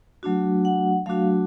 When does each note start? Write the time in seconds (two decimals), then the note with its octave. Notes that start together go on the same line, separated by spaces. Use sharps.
0.23 F#3 A3 D4 F#4
0.65 F#5
1.06 F#3 A3 D4 F#4 F5